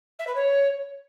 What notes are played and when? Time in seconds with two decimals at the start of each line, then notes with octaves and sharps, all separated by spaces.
0.19 E5
0.27 B4
0.35 C#5